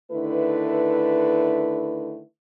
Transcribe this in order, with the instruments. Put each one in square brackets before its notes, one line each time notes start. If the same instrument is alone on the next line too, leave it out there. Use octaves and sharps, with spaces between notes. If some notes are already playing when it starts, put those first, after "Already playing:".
[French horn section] D3 D#3 A3 E4 B4